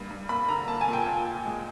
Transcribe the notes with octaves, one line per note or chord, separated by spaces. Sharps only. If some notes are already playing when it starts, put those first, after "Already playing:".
Already playing: G2 A#3
G2
A#3 B5
D3 A#5
A#3 A5
G#5
A#2
G5
A#2
A#2
G#3